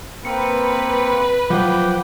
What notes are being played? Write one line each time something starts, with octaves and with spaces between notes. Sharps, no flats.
A#3 C4 B4 C#7
F3 F#3 F#5 G5 D6